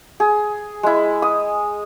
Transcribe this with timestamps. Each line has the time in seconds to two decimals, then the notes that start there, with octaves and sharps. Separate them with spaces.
0.20 G#4
0.83 G#3 E4
1.22 D#6